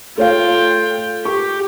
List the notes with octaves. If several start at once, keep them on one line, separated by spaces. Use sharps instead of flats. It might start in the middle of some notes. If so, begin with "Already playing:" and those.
A3 F4 C#5 F5 G5
G4 C#6